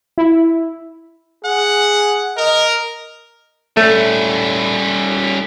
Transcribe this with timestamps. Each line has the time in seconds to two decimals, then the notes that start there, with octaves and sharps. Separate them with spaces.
0.18 E4
1.45 G#4 F#5
2.37 A#4 D#5
3.77 G3 A3 C#4